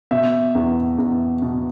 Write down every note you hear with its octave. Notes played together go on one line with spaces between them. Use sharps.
B2 E5
E2
E2
B2